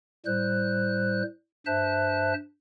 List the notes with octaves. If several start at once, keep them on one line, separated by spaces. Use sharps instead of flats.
A2 G3 C5 F#6
G2 C5 E5 A5 F#6